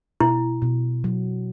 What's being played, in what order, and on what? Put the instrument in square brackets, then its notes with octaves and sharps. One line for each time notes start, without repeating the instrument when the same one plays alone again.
[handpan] B2 [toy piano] E4
[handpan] B2
F#3